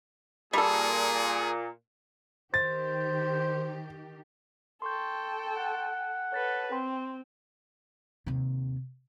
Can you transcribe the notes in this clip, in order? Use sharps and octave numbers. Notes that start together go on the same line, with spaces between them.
A#2 G3 G#4 A4
D#3 G4 C5 A6
A4 G5 C6 C#6 G6
F#5
A4 B4 C#5 A6 B6
C4 G5 C6
D#2 C3